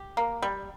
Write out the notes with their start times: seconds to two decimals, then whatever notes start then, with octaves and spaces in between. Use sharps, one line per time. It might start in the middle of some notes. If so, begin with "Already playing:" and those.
Already playing: G4
0.17 A#3
0.42 G3